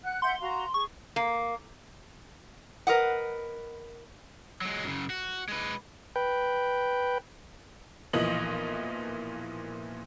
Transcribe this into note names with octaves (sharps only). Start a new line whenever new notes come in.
F#5 F#6
E5 F#5 C6 G6
F#4 F5 A#5
G#4 C#6
A#3
A#4 B4 D#5 F#5
F#3 G#3
F#2 C#3
F#4
G#3 B4
B4 G5
B1 A#2 E3 F3 D#5 F#7